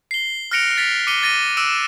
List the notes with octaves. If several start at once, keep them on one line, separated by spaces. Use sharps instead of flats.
C7 G7
F6 F#6 A#6 C#7 D7 F7
A6 B6 F7
D6 C#7 D#7 G7
D6 A6 A#6 D#7 G7
D6 E6 F#6 D7 E7